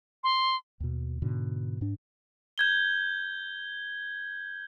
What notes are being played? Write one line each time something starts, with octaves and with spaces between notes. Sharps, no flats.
C6
D#2 B2
G#2 B2 D3
G#2 D4
G6 G#6 G7